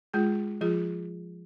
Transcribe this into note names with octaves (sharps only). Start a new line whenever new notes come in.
G#3 F4 G#4
F3 F4 G#4